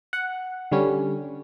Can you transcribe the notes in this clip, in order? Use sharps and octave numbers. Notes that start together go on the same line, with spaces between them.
F#5
D3 G3 C#4